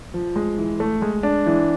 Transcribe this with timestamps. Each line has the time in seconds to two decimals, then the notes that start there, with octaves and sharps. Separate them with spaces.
0.14 F3
0.36 G#3
0.58 E3
0.80 A3
1.02 G#3
1.23 D4
1.46 E3